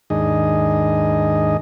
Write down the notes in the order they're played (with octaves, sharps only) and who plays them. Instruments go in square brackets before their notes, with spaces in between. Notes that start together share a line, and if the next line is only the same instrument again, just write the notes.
[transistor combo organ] D#2 G#2 D#3 D4 G#4 D#5